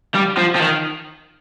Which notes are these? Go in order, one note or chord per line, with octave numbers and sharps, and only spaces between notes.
G3
F3
F3
D#3